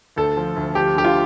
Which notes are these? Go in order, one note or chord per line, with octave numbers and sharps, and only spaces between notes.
D2 A4
F3
D2
F3 G4
D3 G4
F4